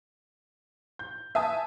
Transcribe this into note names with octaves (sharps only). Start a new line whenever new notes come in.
G6
E5 G#5 A5 D#6